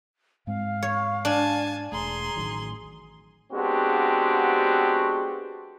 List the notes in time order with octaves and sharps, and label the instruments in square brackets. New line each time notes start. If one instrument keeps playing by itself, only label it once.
[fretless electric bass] G#2 G#3 C4 [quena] F5
[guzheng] C#5
[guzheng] D4 [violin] G#5 A5
[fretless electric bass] E1 A3 [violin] G#4 C6 [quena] A#5
[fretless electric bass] A1 D#3 F#3
[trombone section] G#3 B3 C4 D4 F#4 G4